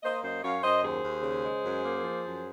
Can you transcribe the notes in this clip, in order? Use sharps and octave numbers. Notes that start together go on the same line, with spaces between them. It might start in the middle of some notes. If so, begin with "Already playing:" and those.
A#3 C5 D#5
F#2 C5 D#5
F#2 C#5 F5
F#2 C5 D#5
D#2 G#4 C5
D#2
C#3
G#3
F#2
A#3
F3
F#2